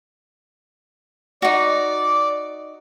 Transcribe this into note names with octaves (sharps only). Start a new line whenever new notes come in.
D#4 F#4 D5